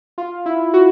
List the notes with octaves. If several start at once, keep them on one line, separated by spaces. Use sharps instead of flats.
F4
E4
F#4